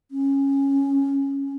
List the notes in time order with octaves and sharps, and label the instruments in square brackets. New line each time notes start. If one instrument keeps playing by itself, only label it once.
[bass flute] C#4